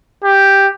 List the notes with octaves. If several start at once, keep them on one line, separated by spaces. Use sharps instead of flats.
G4